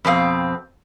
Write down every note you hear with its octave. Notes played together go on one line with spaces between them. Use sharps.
F2 B2 C4 F5